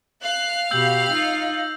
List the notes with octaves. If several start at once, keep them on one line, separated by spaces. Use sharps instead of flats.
F5 F#6
B2 G4 E6 G6 F#7
D#4 F4